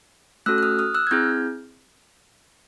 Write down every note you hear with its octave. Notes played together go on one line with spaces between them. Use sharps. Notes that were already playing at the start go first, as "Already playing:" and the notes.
A3 C#4 F#4 A4 E6 F#6
F#6
D#6 F6
D#6 F6
E6 F#6
G#6
C4 E4 G#4 F6 G6